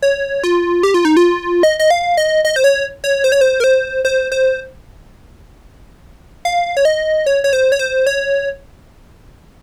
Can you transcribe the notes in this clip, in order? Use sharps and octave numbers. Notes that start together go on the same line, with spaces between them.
C#5
F4
G4
F4
D#4
F4
D#5
D#5
F5
D#5
D#5
C5
C#5
C#5
C5
C#5
C5
A#4
C5
C5
C5
F5
C#5
D#5
C#5
C#5
C5
C#5
C5
C#5